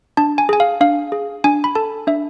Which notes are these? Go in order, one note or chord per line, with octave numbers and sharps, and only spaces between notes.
D4 A5
G#5
G#4 G#5
F5
D4 F5
G#4
D4 G#5
B5
A4 A5
D4 E5